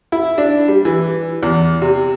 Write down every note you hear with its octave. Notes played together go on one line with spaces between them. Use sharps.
E4
D4
G3
E3
E2
C3